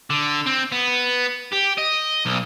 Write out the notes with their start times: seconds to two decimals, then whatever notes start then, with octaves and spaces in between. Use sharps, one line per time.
0.10 D3
0.46 C4
0.72 B3
1.52 G4
1.78 D#5
2.26 B1